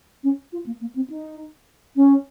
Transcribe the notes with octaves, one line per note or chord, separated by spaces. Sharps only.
C#4
F4
A#3
A#3
C4
D#4
C#4